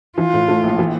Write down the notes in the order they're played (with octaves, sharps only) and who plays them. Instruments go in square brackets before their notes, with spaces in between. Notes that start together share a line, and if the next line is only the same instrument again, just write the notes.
[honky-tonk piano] E3 [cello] F4
[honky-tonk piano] A2
A3
A#1
E3